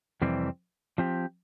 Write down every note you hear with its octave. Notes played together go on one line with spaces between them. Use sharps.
F2 C3 E3 G3 C4
F3 C4 G4